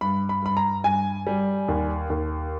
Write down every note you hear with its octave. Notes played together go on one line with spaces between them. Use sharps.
G2 B5
B5
G2 B5
A#5
G2 G#5
G3
D#2
D#2